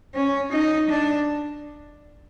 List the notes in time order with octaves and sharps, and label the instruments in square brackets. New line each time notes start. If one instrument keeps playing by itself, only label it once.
[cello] C#4
D#4
D4